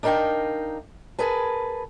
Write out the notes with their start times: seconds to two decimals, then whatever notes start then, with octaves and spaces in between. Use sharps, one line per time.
0.03 D4 D#4 A#4 F5 G5
1.19 G#4 A#4 B4 A5